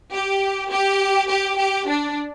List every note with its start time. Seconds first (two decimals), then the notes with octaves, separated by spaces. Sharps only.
0.12 G4
0.72 G4
1.30 G4
1.59 G4
1.89 D4